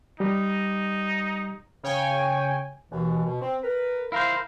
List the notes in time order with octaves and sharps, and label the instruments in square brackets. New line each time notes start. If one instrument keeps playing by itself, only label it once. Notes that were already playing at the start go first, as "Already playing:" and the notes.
[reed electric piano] G3 G4 [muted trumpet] D#4
[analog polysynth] C#3 C#5 G5 G#5
[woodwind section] D#2 B2 E3
B2
C4
A#4 B4
[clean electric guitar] E4 A#4 C5 [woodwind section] F5